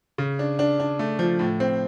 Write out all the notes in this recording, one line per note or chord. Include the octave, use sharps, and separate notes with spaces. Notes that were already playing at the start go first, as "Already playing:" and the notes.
C#3
D4
D4
D4
A3
F3
A2
C4